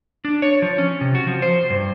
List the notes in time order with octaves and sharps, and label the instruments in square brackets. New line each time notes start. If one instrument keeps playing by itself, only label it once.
[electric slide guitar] D4
C#5
F3
C#4
C3
F#4
F3
C5
G2